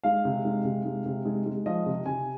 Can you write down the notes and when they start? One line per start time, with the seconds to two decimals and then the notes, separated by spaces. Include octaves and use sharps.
0.04 G#3 F5
0.25 C3
0.45 G#3
0.65 C3
0.85 G#3
1.06 C3
1.25 G#3
1.46 G#3
1.66 F3 D#5
1.86 C3
2.06 C3 G#5